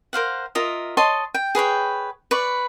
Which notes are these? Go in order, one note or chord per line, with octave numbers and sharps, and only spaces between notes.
A#4 C5 F5 F#5
F4 A#4 D#5 E5
C#5 D#5 A5 C6
G5
G#4 B4 C#5 G5
B4 D5 C#6